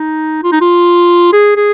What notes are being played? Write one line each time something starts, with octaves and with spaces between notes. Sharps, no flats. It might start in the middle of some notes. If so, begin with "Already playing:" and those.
Already playing: D#4
F4
D#4
F4
G#4
G#4